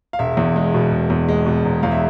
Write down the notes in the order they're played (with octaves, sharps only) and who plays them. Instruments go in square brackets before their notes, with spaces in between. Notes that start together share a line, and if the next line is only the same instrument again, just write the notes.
[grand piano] F5
E1 E5
E2
G#3
B2
E1
E2
G#3
B2
E1
E2 F5
E5